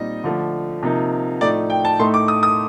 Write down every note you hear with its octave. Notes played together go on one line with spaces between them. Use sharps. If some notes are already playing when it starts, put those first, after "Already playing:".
Already playing: A#2 G3 C4 D#4 D#5
D3 F3 A3
C3 F3 A#3 D#4
A2 F3 A3 D#4 D5
G5
A5
A2 A3 D#4 C6
D6
D#6
D#6